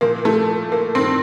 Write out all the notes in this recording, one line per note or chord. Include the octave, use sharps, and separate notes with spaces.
A#2 F3 A#3
A3
A#3
G2 D#3 C4